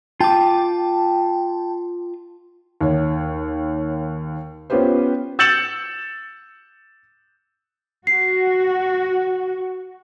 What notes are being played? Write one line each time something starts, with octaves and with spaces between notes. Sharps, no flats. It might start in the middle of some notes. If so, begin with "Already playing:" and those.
F4 G5 A5 D6
D#2 C#5
B3 C#4 F4 G4 B4 C5
E6 G6 A6 C#7 E7 F#7
F#4 C7